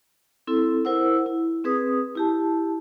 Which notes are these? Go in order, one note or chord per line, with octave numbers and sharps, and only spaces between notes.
C4 E4 A4
E4 A#4 C5 F#5 E6
E4
C4 G#4 B4 D#6
E4 G4 A5